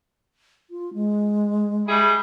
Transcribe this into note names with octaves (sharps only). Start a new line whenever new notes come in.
F4
G#3
G3 E4 G#4